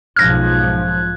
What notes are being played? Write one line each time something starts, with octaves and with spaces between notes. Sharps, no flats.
B1 G#2 F3 F6 F#6 G#6 A#6